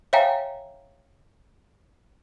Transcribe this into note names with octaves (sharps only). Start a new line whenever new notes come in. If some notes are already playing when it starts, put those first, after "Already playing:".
C#5 E5 F5 G5 G#5 A#5